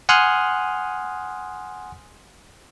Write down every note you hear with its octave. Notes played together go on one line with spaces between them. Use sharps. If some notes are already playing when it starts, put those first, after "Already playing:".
F#5 G#5 C6 D#6 F6 F#6